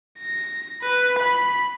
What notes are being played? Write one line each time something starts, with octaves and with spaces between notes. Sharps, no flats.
A#6
B4
B5